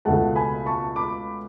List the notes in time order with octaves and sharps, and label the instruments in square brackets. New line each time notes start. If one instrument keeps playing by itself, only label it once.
[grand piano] C#2 B2 A3 F#5 A5
G#5 B5
A5 C#6
B5 D6